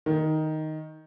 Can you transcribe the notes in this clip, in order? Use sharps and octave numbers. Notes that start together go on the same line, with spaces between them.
D#3